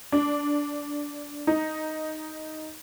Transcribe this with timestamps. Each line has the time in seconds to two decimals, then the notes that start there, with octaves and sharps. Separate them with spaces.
0.12 D4
1.47 D#4